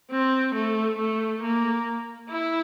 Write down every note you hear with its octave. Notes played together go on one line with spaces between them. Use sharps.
C4
A3
A3
A#3
E4